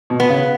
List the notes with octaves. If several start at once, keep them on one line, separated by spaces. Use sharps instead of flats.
B2
B3
C#3